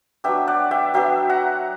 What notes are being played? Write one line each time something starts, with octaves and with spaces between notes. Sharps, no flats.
F#3 B3 D4 E5 G5
D5 F#5
E5 G5
F#3 B3 D4 E5 G5
F#5 A#5